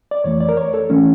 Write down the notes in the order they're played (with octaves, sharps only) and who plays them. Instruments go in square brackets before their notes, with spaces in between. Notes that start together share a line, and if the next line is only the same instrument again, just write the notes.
[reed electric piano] D5
F2 E3 A3 C#5
D5
A#4
C#5
A4
E3 A3 C#4